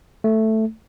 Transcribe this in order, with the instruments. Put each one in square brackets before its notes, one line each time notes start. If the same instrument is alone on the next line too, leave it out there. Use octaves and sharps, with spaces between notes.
[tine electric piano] A3